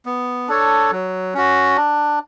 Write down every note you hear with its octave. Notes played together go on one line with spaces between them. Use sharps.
B3
D4 A4 C#5
F#3
C#4 F#4
D4